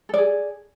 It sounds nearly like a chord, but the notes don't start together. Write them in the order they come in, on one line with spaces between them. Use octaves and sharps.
A4 D5 G#4